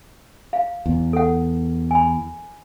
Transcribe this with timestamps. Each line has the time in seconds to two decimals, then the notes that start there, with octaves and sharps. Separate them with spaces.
0.53 F5
0.86 E2
1.13 A4 F#5
1.91 G#5 B5